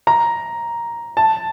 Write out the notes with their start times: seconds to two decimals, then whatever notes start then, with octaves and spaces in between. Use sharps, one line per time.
0.07 A#5
1.17 A5